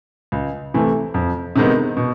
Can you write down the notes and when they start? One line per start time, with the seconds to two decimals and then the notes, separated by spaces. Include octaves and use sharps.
0.32 C#2
0.74 C3 E3 A3
1.14 F2
1.56 C3 D#3 G#3 B3
1.97 B2